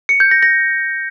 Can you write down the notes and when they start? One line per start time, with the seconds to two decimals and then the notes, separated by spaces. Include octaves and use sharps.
0.09 C#7
0.20 G6
0.31 A#6
0.43 A#6